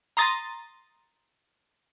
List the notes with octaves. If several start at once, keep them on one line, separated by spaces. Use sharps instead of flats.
A#5 C6 D#6 A6